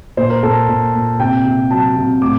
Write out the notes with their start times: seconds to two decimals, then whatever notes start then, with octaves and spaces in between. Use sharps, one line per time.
0.17 A#2 C5
0.30 A#4
0.43 A#2 A4
0.68 A#2
0.94 A#2
1.19 C3 G5
1.45 C3
1.71 F#3 A5
1.96 C3
2.21 A2 D6